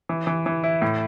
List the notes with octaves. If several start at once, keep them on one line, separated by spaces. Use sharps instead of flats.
E3
E3
E3
E4
A2